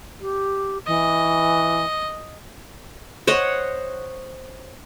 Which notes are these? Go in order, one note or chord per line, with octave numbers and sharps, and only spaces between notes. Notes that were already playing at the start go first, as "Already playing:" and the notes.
G4
E3 D#5
C5 C#5 D#5 F#5